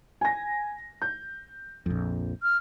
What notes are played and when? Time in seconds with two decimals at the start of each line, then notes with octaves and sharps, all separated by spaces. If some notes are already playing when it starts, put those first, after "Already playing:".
0.21 G#5 A#6
1.02 G6
1.86 A#1 F2
2.43 F6